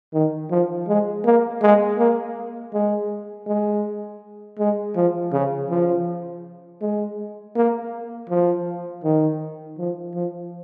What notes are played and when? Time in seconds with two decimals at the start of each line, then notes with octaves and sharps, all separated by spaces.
0.13 D#3
0.51 F3
0.88 G#3
1.25 A#3
1.62 G#3
1.99 A#3
2.73 G#3
3.47 G#3
4.59 G#3
4.96 F3
5.33 C#3
5.70 F3
6.81 G#3
7.56 A#3
8.29 F3
9.04 D#3
9.78 F3
10.15 F3